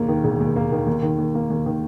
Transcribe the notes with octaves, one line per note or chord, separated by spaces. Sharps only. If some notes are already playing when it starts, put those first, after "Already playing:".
Already playing: E1 D#2 A#3
D#3
E1
D#2
A#3
D#3
D#2
D#3
D#2
A#3
D#2
D#3